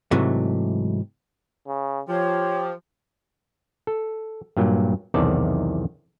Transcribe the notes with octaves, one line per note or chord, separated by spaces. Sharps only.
G#2 C3 E3 F#3 A3
C#3
F3 G4 C#5
A4
G2 A#2 F#3
B1 E2 C3 D#3 D5 A5